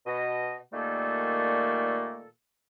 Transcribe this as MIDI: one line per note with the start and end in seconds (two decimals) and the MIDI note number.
0.06 0.56 47
0.06 0.56 75
0.73 2.27 46
0.73 2.27 51
0.73 2.27 55
0.73 2.27 57
0.73 2.27 58
0.73 2.27 69